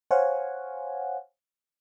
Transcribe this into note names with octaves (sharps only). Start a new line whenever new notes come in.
C5 C#5 F5 F#5 G#5